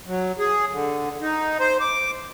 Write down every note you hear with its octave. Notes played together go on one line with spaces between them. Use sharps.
F#3
G#4
D3
D#4
C5
D6